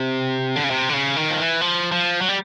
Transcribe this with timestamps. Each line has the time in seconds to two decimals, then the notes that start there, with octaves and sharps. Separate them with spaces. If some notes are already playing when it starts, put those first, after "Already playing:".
Already playing: C3
0.56 D3
0.64 C#3
0.70 C3
0.89 D3
0.93 C#3
1.16 D#3
1.30 F3
1.39 E3
1.61 F3
1.92 F3
2.21 F#3
2.29 G3